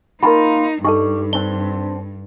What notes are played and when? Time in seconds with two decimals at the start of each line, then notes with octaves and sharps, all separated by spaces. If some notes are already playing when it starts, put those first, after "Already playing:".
0.23 A#3 D#4 F4 A#4 A#5 B5
0.85 G2 G3 D#4 A4 C#6
1.33 C4 D4 G7